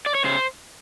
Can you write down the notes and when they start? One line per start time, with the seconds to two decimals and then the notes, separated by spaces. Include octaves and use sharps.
0.06 D5
0.15 C#5
0.24 C#3 C5